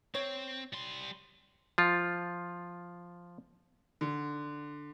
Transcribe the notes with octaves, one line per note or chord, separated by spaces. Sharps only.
C4 C#5
G3 C6
F3 F4
D3